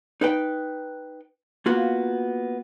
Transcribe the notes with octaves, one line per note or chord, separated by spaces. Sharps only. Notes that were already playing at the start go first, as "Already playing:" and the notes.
D#4 B4 G5
A#3 B3 F4 F#4